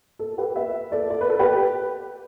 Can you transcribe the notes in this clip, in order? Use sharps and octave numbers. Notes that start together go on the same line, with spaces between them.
A4
G4 B4
B4 E5
A4 D5
D5
B4
A4
G4 B4